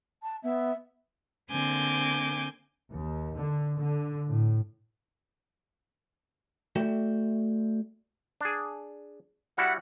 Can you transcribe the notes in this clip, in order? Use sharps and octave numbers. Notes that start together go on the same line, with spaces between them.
A5
B3 E5
D3 A#3 C4 G#5 D6 G6
D#2
D3
D3
A2
A3 F#4 A4 D5 E5 G5
D4 G#4
G3 E4 F#4 F#5